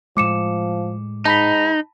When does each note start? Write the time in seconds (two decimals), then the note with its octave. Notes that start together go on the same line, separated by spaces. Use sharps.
0.17 A2 F3 G#3 D6 C#7 E7
1.25 G#2 D#4 A5 B5 B6